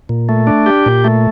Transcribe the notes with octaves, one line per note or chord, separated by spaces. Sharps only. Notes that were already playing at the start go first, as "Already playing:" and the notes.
A#2
A3
D4
G4
A#2
A3